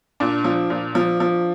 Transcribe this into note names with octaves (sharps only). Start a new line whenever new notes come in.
A#2 D4
F3
A#2
F3
F3